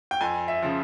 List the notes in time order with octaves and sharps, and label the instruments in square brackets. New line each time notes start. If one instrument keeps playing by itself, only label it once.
[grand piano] G5
F2 G#5
E5
C#3 F3